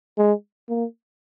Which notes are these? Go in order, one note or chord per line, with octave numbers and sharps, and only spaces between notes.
G#3
A#3